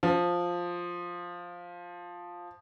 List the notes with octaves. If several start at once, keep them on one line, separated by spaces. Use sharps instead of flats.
F3